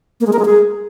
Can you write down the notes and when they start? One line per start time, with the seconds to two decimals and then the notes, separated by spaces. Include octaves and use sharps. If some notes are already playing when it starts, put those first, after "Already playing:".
0.20 A#3
0.27 G#3
0.33 A#4
0.39 G#3
0.45 G#4